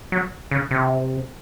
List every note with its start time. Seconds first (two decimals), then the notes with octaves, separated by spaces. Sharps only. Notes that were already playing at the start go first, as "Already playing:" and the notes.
0.12 F#3
0.51 C#3
0.71 C3